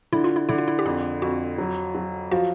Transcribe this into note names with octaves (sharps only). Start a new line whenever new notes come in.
D3 E4
F4
E4
D3 E4
F4
E4
G4
F2 G#4
F2 F#4
F#3
F#3
F3 F#4